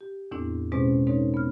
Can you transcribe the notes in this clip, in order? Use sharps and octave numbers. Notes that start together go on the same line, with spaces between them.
G4
E2 A2 B3 C4 D4 E4
B2 G#3 C4 C#4 G#4 C5
G#3 C4 D#4 A#4 C#5
B3 F6